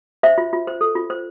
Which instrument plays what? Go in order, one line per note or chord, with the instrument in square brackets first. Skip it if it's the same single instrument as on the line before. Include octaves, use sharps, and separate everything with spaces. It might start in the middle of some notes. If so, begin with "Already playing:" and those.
[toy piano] C5 E5
F4
F4
C5
A4
F4
C5